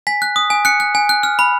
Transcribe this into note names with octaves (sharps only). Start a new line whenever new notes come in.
G#5 B6
F#6
D#6
G#5
F#6 C#7
F#6
G#5
F#6
F6
B5